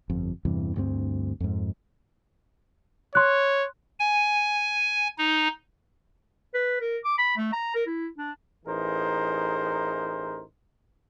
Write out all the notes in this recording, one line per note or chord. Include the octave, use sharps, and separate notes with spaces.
G1 F2
E2 G2 C3 E3
D2 G2 A3 C4
F2 G#2
C#5 C6 F#6
G#5
D#4
B4
A#4
D6
B5
A3
A#5
A#4
E4
D4
A1 E3 D#4 G#4 A#4 C5